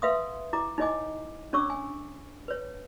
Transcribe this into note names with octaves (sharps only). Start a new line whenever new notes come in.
B4 E5 F5 C6 D#6
E4 A#5 D6
D#4 E4 C#5 D#5 G#5 D6
C#4 D4 C#5 C#6 D6 E6
G#5
B4 C#5